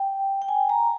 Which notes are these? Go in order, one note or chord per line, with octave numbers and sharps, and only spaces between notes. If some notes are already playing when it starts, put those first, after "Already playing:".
Already playing: G5
G5
G#5
A#5